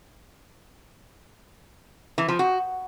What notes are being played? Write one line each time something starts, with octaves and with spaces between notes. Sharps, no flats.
E3
F3
F#4